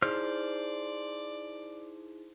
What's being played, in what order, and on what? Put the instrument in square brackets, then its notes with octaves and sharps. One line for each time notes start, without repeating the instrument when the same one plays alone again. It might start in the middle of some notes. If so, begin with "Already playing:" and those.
[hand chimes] D#4 E4 G#4 [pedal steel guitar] C5 F6 [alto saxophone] D5